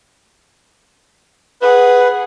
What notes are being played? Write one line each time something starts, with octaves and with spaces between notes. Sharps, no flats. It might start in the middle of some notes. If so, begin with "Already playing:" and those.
G#4 B4 F#5